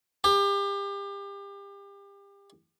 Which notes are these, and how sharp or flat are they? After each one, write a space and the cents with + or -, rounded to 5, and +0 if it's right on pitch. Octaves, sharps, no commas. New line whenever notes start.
G4 +30